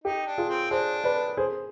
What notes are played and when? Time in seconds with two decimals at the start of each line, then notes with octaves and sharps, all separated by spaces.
0.04 D#4 G4
0.26 D4
0.38 F4 G#4
0.49 C4
0.71 D4 G#4 C5
1.04 B4 D5
1.37 G#4 C5